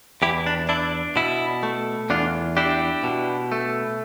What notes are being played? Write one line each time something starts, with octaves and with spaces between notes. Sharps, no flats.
E2 E4 G4
D4
D4 E4
B2 E4
A3
E2 D4 F4
D4 E4 G4
B2
A3